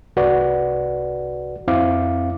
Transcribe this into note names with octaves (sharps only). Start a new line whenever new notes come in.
C2 F#4 B4 D5
F2 C4 E4 F5 D6